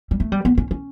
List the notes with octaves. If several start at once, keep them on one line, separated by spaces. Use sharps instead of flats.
G3
A3
G3
B3
C#4
C#4